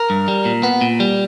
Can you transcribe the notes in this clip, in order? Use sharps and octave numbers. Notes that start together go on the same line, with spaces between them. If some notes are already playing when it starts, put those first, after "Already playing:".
Already playing: A#4
G2
G3
A#2
B3
A#2
G3